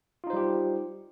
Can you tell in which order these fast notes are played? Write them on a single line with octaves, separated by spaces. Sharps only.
F4 D#4 C5 G3 G4